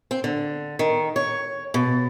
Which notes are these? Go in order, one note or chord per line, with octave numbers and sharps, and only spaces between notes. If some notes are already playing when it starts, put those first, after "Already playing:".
C4
D3
D#3
C#5
B2